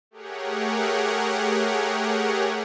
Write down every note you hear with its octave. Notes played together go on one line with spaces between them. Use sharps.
A3 G4 G#4 A#4 C#5 F#5